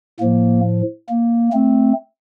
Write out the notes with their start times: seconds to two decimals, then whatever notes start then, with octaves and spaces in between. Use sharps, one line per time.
0.20 A2 F3 A#3
1.09 A#3
1.53 A3 C4